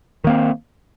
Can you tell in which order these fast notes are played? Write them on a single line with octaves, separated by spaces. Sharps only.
D#3 A#3 C4